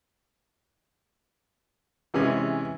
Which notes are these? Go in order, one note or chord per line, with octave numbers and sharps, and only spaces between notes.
C3 E3 G#3 C#4